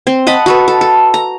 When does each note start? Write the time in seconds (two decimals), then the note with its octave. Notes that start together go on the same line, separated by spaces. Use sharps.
0.07 C4
0.27 D#5 F#5 A5 B5
0.46 F#4 A4 B4
0.68 A4
0.81 A4
1.14 A#5